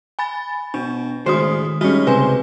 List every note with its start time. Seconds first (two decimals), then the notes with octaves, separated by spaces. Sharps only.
0.19 G#5 B5 A6
0.74 B2 D4
1.26 C#2 A2 D#3 F#4 C5 D#6
1.81 G3 G#3 C#4 D#4 F#4
2.07 C#2 C3 B4 C5 G#5